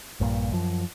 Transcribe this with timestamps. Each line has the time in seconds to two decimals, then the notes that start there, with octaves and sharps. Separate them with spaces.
0.20 A#1 G2 A#2
0.52 F#2 F3